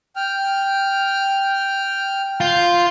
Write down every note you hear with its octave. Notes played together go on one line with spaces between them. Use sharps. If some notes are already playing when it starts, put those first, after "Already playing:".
G5 F6
F4 G6